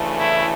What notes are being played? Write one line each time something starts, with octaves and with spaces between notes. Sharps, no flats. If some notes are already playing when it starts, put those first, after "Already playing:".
Already playing: D2 C#3 E3 A3
E4